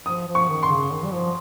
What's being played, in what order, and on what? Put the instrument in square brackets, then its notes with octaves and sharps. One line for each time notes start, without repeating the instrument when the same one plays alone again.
[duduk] F3 [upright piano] D#6
[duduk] F3
[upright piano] C#6
[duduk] D#3
[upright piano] C6
[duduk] C#3
D#3
G3
F3